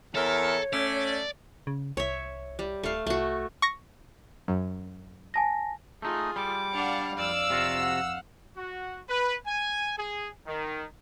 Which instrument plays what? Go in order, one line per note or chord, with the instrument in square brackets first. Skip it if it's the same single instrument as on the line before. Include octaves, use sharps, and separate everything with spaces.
[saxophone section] E2 A#4 E5 [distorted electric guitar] A4 [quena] C#5
[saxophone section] A3 C#4 [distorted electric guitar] D5
[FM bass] C#3
[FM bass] C2 [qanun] C#5 E5
[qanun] G3
[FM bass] D1 [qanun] A3 F5
[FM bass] C2 [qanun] A3 F#4
[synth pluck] C#6 A#6
F#2
[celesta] G#5 A5 A#6
[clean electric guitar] A3 D#4 [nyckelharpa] F4 G#4
[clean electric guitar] G3 [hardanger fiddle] D6
[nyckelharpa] D4 [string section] D5 F5 F#5
[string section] F2 E6 [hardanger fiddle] D5 [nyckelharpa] F5
[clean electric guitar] C3 F4 F#4
[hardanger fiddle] F#5
[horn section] F#4
B4
G#5
G#4
D#3